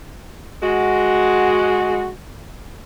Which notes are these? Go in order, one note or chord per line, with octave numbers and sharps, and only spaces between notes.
G#3 F#4